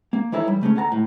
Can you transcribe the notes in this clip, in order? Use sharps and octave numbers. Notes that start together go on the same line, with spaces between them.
A#3
E3 D#4 E4 A4 C#5
G3
C#3 A3 A#3 C#4
D2 A4 F#5 A5 A#5
A2